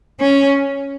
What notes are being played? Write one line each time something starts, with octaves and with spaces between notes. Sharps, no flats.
C#4